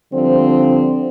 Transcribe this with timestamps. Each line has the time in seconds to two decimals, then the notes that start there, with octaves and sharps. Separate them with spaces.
0.12 D3 F3 G3 C4